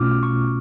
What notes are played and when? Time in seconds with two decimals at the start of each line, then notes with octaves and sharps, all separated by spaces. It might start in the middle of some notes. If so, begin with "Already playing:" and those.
Already playing: B1 B2 A3 C#4 F4 D6 F6
0.23 C#6